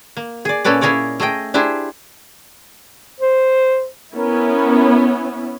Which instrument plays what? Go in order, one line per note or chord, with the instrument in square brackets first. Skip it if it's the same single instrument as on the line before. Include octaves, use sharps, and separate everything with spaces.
[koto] A#3
G#4 D5
A#2 A#3 C#4 A4 B4 D5
C#4 E4 G#4 A#4 C#5 D5
A3 G#4 D#5 G5
D4 E4 G4 G#4 C5
[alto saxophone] C5
[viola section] B3 C#4 E4 [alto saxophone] A#4